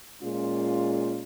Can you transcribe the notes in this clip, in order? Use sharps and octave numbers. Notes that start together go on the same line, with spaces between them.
A#2 G#3 C#4 F4